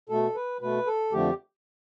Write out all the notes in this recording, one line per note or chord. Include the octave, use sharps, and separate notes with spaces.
B2 A3 A4
B4
B2 A3 B4
A4
F2 D3 F3 A3 G4